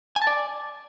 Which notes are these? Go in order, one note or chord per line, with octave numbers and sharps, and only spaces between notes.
G#5
A5
D5